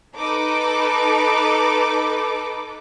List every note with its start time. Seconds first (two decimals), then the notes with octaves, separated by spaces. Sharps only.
0.17 D#4 A4 B4 D6